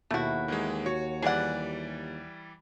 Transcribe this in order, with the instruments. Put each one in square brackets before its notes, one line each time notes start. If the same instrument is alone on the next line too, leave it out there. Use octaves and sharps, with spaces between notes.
[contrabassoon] D#2 [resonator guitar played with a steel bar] B2 E4 [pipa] A3 F#4
[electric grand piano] D#3 E3 G#3
[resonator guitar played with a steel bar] F#4 [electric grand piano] C#5
[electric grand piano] E3 G3 D5 [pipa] G#4 F#5